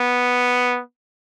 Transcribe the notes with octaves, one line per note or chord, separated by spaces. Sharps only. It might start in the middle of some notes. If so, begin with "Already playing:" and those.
Already playing: B3